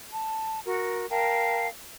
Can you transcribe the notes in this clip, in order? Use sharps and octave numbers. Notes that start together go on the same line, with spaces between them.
A5
F#4 A#4
A#4 F5 G5 A5